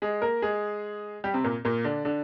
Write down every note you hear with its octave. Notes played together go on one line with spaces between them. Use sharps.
G#3 G#4
A#3 A#4
G#3 G#4
G3 G4
C3 C4
A#2 A#3
A#2 A#3
D3 D4
D3 D4